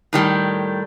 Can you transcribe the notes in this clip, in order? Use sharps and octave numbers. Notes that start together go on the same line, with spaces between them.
A2 D#3 G3